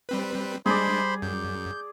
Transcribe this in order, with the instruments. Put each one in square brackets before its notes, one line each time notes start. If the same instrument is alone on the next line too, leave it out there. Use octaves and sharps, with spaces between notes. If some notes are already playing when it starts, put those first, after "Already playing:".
[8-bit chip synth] G3 C4 B4
[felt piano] G3 [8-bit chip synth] G#3 D4 [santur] G#4 D5 [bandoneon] C5 B5 C6
[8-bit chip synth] F#2 [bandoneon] G6